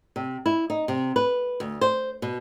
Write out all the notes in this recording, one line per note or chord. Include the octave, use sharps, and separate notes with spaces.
C3
E4
D#4
C3
B4
D2
C5
B2